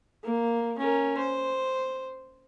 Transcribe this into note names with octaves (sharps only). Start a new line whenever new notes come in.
A#3
C#4 A#4
C5